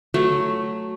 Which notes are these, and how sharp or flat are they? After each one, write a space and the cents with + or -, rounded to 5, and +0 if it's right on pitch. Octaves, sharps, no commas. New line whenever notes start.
F#3 +0 A3 +0